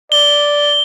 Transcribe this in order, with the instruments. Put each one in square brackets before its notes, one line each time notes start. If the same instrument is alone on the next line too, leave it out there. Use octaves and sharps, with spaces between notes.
[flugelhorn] D5 [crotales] G7